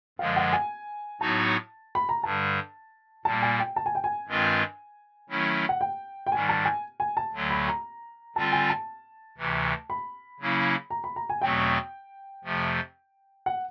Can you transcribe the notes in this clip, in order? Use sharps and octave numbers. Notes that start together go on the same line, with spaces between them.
F#2 D3 F3 G#3 F5
F#5
G#5
A2 F#3 B3 D#4 F#4 A5
B5
A#5
G2 D3 G3 A5
A#2 G3 A#3 A5
G#5
G5
A5
G#5
G5
G#5
G2 D#3 G#3 C4 F4
D#3 F#3 A3 C#4 E4
F#5
G5
G5
G#2 D#3 G3 G#5
A5
G#5
G#5
A5
D2 D3 F#3 A3
B5
A#5
D3 G3 C4 F4 A5
G#5
A5
D2 C3 E3
B5
C#3 F#3 A#3 C#4 E4
A#5
B5
A#5
G#5
E2 B2 F#3 A3 C4 G5
F2 C3 F3 A3
F#5